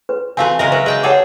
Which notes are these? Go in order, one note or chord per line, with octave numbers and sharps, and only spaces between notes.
B4
E3 A3 C4 F#4 F5 G#5
C#3 G#3 A#4 E5
F#3 B4
G#3 G5 A5
G3 G#4 A4 C#5 F#5 D6